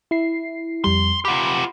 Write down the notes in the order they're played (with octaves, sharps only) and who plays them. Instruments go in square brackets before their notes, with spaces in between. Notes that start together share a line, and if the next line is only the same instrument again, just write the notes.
[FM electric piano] E4 C7
[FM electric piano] F2 G3 [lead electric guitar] C6
[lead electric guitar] F4 G4 [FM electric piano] F#5 B5